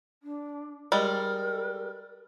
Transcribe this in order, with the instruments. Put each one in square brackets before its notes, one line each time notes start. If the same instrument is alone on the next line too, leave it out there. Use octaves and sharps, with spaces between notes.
[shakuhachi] D4
[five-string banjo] G3 G#3 [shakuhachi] A#4